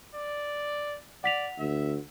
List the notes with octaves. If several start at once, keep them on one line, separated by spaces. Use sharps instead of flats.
D5
D5 F#5 B6 F7
D2 E5